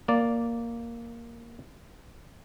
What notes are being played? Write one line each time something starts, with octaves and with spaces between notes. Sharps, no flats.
A#3 D5